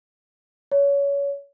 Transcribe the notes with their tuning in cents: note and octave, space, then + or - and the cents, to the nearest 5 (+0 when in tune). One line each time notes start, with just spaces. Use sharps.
C#5 +25